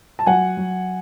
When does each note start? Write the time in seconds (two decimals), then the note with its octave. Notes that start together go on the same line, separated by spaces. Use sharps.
0.19 A5
0.26 F#3 F#5 G#5
0.57 F#3